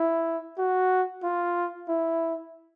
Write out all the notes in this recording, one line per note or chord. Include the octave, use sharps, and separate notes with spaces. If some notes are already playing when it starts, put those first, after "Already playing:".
Already playing: E4
F#4
F4
E4